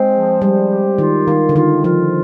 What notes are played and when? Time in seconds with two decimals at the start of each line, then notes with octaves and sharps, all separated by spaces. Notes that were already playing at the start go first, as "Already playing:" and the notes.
Already playing: G#3 C4
0.14 F3
0.42 G3 C4
0.70 G4
0.98 D#3 F4
1.27 D#3 A#3
1.49 D3
1.56 D#3 F4
1.84 F3 F4